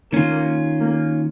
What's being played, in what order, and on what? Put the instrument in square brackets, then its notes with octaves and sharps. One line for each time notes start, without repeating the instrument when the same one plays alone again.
[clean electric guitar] D#3 C#4 F4 [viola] A#3
[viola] A#3